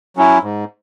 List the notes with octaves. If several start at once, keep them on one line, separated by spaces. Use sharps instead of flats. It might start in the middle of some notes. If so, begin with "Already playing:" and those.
F#3 C#4 E4
G#2